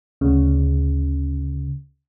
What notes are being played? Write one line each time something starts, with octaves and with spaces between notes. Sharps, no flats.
D2 C#3